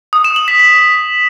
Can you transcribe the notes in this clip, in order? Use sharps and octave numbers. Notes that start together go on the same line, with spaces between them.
D#6
E7
F#7
B6
B6